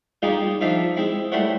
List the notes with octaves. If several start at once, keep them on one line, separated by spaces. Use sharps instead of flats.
G3 G#3 A#3 D#4 F4 G4
D#3 F3 D4 E5 F5 D6
G#3 C4 E4
G3 A3 E4 C5 C#5 F#5